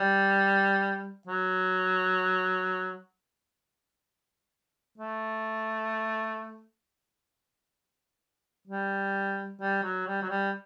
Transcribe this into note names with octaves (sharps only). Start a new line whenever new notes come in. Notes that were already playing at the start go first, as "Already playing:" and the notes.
Already playing: G3
F#3
A3
G3
G3
F#3
G3
F#3
G3